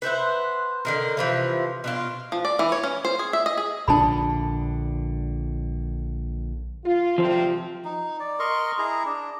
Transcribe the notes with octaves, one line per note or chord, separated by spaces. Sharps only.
B4 C5 E5 F#5
D3 D#3 A#4
C3 E3 F3
B2 D4 F4
F3
D5
E3
C#5
C#4
C5
G#4
E5
D#5
G#4
A#1 D3 D4 A5 B5
F4
D2 C3 F3 C4
D#4
D5
A#4 D#5 C6 C#6
E4 G#4 A#5
D4